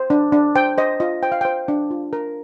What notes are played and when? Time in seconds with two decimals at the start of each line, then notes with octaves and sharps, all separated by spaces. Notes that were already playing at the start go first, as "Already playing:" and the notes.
Already playing: C5
0.10 D4
0.32 D4
0.55 C5 G5
0.78 C5 D#5
1.00 F4 D#5
1.23 C5 G5
1.32 F5
1.41 C5 G5
1.68 D4
1.91 F4
2.13 A#4